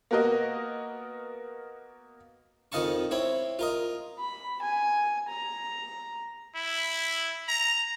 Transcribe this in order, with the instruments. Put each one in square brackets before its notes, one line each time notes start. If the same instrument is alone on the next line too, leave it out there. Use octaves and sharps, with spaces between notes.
[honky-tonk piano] A#3 B3 F#4 A#4 D#5
[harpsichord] F2 D#3 D#5 F5 A5 C#6
C4 E4 C#5
F4 A#4 D#5
[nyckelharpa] B5
G#5
A#5
[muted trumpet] E4
A#5